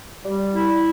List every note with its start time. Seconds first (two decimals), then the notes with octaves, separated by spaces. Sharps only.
0.25 G3
0.53 E4